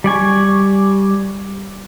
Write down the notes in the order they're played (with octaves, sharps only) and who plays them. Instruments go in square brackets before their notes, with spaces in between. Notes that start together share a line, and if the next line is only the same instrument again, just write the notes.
[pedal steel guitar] G3 D5 G#5 C#6